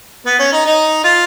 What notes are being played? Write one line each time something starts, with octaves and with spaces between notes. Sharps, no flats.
B3
C#4
D#4
D#4
F4